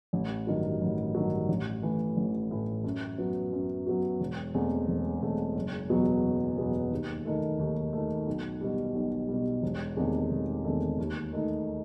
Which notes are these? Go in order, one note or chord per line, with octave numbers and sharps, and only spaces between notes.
A1
G2 D#3 F#3
A1
G2 D#3 F#3
A1
A2 E3
A1
A2 E3
F#2
F#3 B3 F#4
F#2
F#3 B3 F#4
E1
E2 B2 A3 C4
E1
E2 B2 A3 C4
F#1
E2 B2 F#3 B3
F#1
E2 B2 F#3 B3
D#2
D#3 A3
D#2
D#3 A3
B1
B2 G3
B1
B2 G3
E1
E2 C3 D#3 A3
E1
E2 C3 D#3 A3
D#2
D#3 A3 D#4